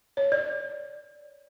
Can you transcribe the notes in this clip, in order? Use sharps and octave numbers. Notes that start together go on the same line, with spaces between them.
C#5
D5